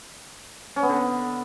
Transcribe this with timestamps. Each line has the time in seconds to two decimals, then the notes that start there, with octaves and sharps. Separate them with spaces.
0.76 C#4
0.83 B3
0.89 D3